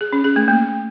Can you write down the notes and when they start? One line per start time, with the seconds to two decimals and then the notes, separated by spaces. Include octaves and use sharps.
0.01 G#4
0.13 C#4
0.24 G#4
0.36 A3
0.48 A#3